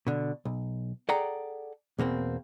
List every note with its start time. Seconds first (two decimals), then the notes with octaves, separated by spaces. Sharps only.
0.07 B2 D3
0.45 B1
1.09 G#4 A4 D5 F#5 G5 A#5
1.98 E2 B2 A#3 C4